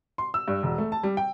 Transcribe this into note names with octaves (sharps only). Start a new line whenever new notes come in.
C6
E6
G2
E1
A3
A5
G3
G5